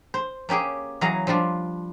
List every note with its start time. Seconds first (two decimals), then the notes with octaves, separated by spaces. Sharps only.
0.14 C5
0.49 A#3 C#4 G4 G#4
1.01 E3 F#3 G#4 F5 A#5
1.27 F3 G3 D4 F4